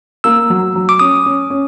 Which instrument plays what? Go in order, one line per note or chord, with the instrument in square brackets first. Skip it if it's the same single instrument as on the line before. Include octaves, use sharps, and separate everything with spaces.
[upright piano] A#3 [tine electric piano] E6
[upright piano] F#3
F#3
[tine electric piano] D6
[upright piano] C#4 [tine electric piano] D#6
[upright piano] C#4
C#4